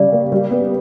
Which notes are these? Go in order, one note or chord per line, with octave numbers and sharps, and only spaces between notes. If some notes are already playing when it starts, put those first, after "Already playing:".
Already playing: C#3 G3 C#4 D5
A#3
G3
B3